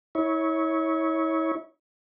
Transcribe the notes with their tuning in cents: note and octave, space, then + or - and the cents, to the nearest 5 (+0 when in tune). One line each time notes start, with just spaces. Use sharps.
E4 -35 C#5 +0